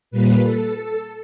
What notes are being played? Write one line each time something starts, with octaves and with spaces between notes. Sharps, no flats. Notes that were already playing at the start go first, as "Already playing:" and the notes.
A#2 G3 A#3 B4
A4